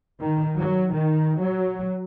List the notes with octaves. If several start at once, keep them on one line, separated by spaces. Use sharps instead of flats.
D#3
F#3
D#3
F#3